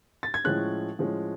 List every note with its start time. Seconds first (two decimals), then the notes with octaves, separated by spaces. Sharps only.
0.23 A6
0.34 G#6
0.44 A2 F3 G#3 C#4 F#6
0.99 A2 F3 G#3 C#4